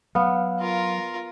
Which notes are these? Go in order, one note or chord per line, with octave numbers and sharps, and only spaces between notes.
F#3 B3 F5
F4 A#4